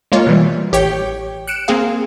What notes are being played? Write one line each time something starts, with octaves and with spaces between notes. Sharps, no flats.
G#3 A#3 F4 C#5
B2 E3 G3
A1 G4 C#5 G5
F#6 C#7 D7 E7
A#3 C4 G#4 F5